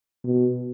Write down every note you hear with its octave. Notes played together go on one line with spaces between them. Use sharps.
B2